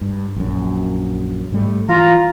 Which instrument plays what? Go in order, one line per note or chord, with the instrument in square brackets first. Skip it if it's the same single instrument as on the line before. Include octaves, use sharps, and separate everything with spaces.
[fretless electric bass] G2
A#1 F#2
G#2 G3 A3
[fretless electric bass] E3 [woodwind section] F4 A#5